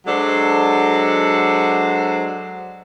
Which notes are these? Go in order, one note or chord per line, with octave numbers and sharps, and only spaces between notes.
F#3 G#3 D4 A4 C5